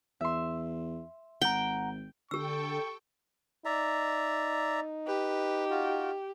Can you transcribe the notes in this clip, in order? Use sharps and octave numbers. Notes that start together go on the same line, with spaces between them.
E2 E5 C6
G#1 F#5 G5 A#5
D3 G4 A4 G5 C#6 E6
D#4 D5 E5 A#5
G4 B4
F4 F#4